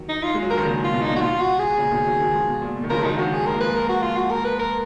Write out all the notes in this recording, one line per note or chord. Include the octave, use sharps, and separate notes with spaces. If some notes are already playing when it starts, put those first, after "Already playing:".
Already playing: D#3 F#3
D#4
F4
G#3
F#3
F3 A#4
D#3
A#2 C#3
F4
B2
A#2 D#4
F#4
B2 F4
F#4
G#4
A#2 C#3
B2 D#3
D#3 F#3
D#3 F#3
F3 G#3
B2
A#2
B2
D#3
C#3 F3 A#4
G#3
D#3 F#3 D#4
D#3 F#3 F#4
G#4
G#3 A#4
A#3
F3 G#3 B4
A#4
F#4
F4
F#4
A#4
B4
A#4